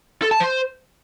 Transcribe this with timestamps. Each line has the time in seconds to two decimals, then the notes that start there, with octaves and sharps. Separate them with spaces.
0.22 A4
0.31 A5
0.40 C5